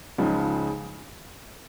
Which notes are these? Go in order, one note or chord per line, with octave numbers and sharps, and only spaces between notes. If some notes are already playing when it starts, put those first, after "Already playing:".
C#2 C#3 F3 G#3 D#4